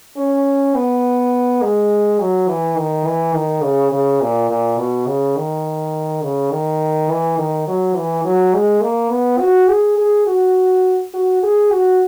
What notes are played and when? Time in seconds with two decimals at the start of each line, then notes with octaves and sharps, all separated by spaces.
0.17 C#4
0.74 B3
1.62 G#3
2.19 F#3
2.48 E3
2.77 D#3
3.06 E3
3.34 D#3
3.63 C#3
3.92 C#3
4.21 A#2
4.49 A#2
4.78 B2
5.07 C#3
5.37 D#3
6.22 C#3
6.51 D#3
7.09 E3
7.38 D#3
7.67 F#3
7.95 E3
8.24 F#3
8.54 G#3
8.82 A#3
9.11 B3
9.39 F#4
9.68 G#4
9.98 G#4
10.27 F#4
11.14 F#4
11.43 G#4
11.71 F#4